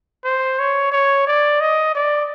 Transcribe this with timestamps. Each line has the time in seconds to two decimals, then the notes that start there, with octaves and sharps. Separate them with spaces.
0.25 C5
0.59 C#5
0.92 C#5
1.27 D5
1.61 D#5
1.95 D5